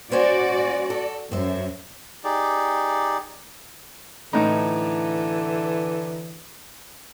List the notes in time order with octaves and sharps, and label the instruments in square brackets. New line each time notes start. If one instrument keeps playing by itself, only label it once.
[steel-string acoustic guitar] C#4 C5 G#5 [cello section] F#4 D5
[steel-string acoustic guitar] A4
[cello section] F#2 [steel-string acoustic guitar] C5 E5
[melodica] D#4 G4 G#4 D5
[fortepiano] A2 D#4 [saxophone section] D3 E3